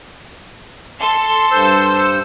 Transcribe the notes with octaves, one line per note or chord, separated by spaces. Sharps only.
A4 C6
G2 C5 E6